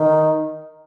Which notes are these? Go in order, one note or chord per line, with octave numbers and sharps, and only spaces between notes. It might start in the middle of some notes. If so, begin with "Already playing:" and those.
Already playing: D#3